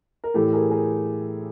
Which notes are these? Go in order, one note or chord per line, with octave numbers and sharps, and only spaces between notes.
A#4
A2 E3 A3 G4 A4
G#4 A#4
G#4 A#4